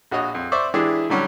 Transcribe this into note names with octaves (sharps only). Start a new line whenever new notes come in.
A#1 F#4 C#5 D#5
F2
C5 D5 E5 C#6 D6
E3 G#3 D4 E4 G4 G#4
D3 F#3 G3 C#4 G4